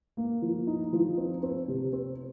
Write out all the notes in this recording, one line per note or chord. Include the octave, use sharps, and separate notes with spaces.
A#3
F3
D#4
F3
C4
C4
C3
C4